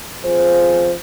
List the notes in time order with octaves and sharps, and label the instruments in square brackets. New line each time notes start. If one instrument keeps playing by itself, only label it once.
[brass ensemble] F3 C4 F4 G#4 C5